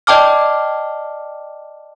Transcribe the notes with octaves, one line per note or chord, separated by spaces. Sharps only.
D5 D#5 G5 A5 D6 F6